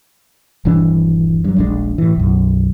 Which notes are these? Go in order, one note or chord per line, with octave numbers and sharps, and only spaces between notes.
D#1 G2 E3 D4
G2 F#3
D#1 A#1 G#3 D4
A2 E3
B1 F#2